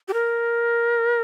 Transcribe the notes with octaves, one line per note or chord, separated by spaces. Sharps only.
G4
A#4